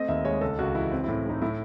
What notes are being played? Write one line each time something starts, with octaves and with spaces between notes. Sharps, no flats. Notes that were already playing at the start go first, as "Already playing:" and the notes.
Already playing: A3 C4 D#5
D#2 E5
G#3 C#5
C#2 A4
C#2 F#4
E3 E4
C4
A2 E4
A3 D#4
A2 E4